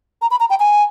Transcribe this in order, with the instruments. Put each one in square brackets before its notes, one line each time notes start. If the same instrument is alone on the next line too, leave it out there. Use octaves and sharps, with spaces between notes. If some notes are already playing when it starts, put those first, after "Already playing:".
[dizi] A#5
B5
A#5
G5
G#5